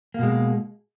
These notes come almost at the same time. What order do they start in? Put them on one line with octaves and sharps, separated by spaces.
A#3 B2 G#3